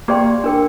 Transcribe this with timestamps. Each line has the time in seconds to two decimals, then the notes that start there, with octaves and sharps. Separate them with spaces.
0.08 A#3 G4 D5 G5 C6
0.44 D4 A#4 G5